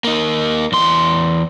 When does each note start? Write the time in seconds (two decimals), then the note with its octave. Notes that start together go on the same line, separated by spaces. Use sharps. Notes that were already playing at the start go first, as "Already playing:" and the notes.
0.04 A#3 D#4
0.72 E2 C6